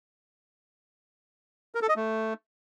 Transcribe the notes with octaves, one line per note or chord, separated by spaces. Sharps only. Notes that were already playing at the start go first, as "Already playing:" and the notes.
A#4
A4
D#5
A3